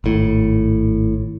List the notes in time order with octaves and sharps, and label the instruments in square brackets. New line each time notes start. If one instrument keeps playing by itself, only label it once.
[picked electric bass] G#1 A2